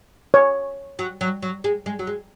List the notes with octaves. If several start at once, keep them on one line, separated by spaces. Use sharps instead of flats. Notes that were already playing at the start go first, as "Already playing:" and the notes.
C#5
F#3
F#3
F#3
G#3
G#3
F#3
G#3